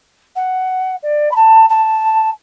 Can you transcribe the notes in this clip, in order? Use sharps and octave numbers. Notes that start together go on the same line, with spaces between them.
F#5
D5
B5
A5
A5